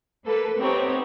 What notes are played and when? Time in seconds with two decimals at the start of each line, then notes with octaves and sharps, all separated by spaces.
0.25 A#3 A4 B4
0.58 B3 C4 D#4 G4 C#5